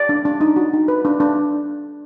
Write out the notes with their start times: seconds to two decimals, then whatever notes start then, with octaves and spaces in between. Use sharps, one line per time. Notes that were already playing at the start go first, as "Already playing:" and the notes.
Already playing: D5
0.09 D4
0.25 D4
0.41 D#4
0.56 F#4
0.73 D#4
0.88 B4
1.05 D4
1.20 D4